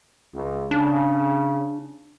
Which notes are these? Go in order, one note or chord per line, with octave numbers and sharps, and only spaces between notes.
C#2
C#3 D4